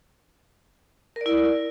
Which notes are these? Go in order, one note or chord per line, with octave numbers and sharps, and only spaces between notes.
E4 A#4 D5